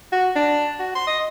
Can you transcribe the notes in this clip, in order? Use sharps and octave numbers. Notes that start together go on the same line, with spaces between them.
F#4
D4
F#4
C6
D#5